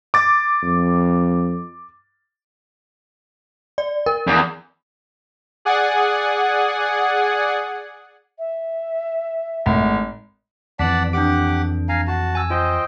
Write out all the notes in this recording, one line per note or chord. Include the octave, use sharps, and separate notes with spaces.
D6 A6
F2
D5
A#4
E2
G#4 D5 F#5 G#5
E5
G#1 A2
F2 E3 D5 F#5 A5 B6
D4 G4 F#5 D6 D7
F5 G#5 A#5
F#4 A5
G#5 E6
F4 C5 D#5 G5